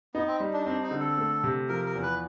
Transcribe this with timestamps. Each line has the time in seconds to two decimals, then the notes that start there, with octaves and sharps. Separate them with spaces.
0.14 B3 D#4
0.28 C4
0.40 G3
0.53 D4
0.66 C4 D4
0.83 D#4
0.91 D3
1.00 A4
1.18 A3
1.44 C3
1.69 F3 A#4
1.86 A#4
1.95 E2
2.03 B4